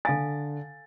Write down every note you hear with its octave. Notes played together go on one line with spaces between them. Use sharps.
D3 A4 F5 G#5 A6